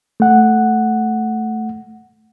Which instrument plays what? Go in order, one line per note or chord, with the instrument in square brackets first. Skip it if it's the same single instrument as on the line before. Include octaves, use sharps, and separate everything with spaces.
[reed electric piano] A3 F#5